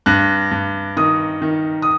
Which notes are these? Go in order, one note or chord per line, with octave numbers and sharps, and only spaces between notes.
G2 F#6
G2
D#3 D#6
D#3
D#6